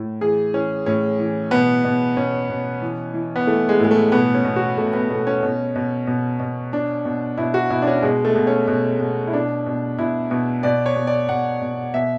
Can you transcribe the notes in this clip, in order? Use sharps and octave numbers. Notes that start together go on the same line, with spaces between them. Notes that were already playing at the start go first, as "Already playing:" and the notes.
Already playing: A2
E3 G#4
E3 C#4
A2 C#4
E3
B2 B3
B2
B2 C#4
B2
E3
E3
B3
E3 A3
G#3
A2 G#3
A3
B2 B3
C#4
B2
F#4
B2 A3
B3
B2 A3
C#4
B2
B2
B2
B2
B2 D4
B2
B2 E4
F#4
B2 E4
D4
C#4
B2 G#3
A3
B2
C#4
B2
B2
E4
B2 D4
B2
B2 E4
B2
B2 D5
C#5
B2
D5
B2 F#5
B2
B2 E5